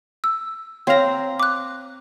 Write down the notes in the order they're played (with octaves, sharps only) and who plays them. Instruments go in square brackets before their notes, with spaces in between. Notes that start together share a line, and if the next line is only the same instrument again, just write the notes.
[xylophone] E6
[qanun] C4 A#5 [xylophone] C#5 F5 F6
[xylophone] D6 F#6